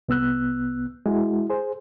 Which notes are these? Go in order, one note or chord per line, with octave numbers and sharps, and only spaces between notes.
C2 B3 E6 F#6
G#3 E4 F#4
G#4 C5